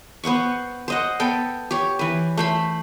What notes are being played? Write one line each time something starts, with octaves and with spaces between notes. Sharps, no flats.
B3 C5 F#5 C#6
C5 D#5 F#5
B3 A4 G5
G4 C#5
E3 B4
A3 C5 B5